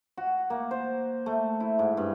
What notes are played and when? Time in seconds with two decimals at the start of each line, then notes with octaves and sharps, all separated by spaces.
0.17 F#4
0.50 A#3
0.71 C5
1.26 A3
1.60 E4
1.79 G#2
1.97 G2